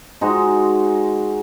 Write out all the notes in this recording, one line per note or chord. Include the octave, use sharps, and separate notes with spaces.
G#3 D#4 F#4 C5